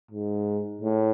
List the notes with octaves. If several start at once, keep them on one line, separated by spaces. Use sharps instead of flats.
G#2
A2